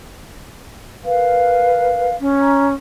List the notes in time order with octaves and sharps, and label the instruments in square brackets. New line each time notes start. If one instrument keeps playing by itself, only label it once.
[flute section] A#4 B4 F5
[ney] C#4
[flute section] A#5